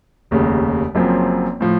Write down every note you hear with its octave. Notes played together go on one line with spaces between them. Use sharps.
F1 D#2 C#3
F#1 F#2 F3 C4
A2 F3